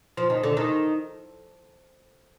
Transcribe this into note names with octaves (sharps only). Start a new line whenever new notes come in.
F3
D#3
D3
D#3